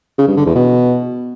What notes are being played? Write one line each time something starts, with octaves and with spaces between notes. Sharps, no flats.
C#3
G2
D3
E2
B2